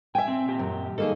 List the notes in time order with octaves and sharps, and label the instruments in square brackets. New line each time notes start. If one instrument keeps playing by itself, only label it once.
[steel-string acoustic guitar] E5 G5 [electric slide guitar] G#5
[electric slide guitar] C4
A#2 G4
[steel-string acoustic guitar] F#2
[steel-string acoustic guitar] D#3 A#3 G#4 [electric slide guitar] A4